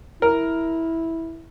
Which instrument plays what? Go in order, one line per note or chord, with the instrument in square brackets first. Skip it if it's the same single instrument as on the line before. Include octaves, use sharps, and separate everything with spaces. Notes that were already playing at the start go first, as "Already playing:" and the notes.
[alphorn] E4 [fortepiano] A#4